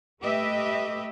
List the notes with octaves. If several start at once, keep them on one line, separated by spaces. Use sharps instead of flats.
A3 G4 B4 D#5 E5